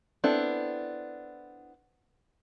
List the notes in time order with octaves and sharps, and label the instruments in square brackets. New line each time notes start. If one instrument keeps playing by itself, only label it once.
[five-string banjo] B3 C4 D4 E4 A4